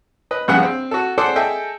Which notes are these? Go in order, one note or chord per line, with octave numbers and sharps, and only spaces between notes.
B4 D#5
A#1 G2 C#3 B3 G#4 F#5
C4
F#4 A4
G#4 A4 C5 D5 F#5
G#4 A4 D#5 E5 G5